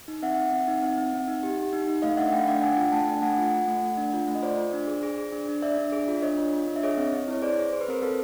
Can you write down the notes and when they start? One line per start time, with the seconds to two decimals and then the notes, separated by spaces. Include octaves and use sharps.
0.08 D#4
0.22 C4 E5 F#5
0.38 C4
0.52 C4
0.68 D#4
0.82 C4
0.98 C4
1.13 C4
1.28 D#4
1.43 G4
1.58 G4
1.73 D#4
1.87 D#4
2.02 A3 D#5 F5
2.17 D4 E5 F#5
2.32 A3 F5 G5
2.47 D4 F5 G5
2.62 D4 F#5 G#5
2.78 F4
2.92 A3 G5 A5
3.08 D4
3.22 A3 F#5 G#5
3.38 F4
3.53 F4
3.67 A3
3.83 A3
3.97 D4
4.13 F4
4.28 A3
4.35 D#5
4.42 F4 C5 D5
4.58 F4
4.73 D4
4.87 G#4
5.03 G#4
5.18 G#4
5.32 D4
5.48 D4
5.62 D4 D5 E5
5.78 D4
5.92 G#4
6.08 F4
6.22 D4 C#5 D#5
6.38 F4
6.53 F4
6.68 D4
6.76 E5
6.83 G#4 C#5 D#5
6.98 C4
7.13 C4
7.28 E4 C#5
7.42 G#4 C5 D5
7.58 G#4
7.73 G#4 C5
7.81 B4
7.88 C4 A#4 C5
8.02 C4 A4 B4